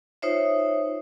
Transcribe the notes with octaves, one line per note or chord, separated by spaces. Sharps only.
D#4 F4 C5 C#5 E5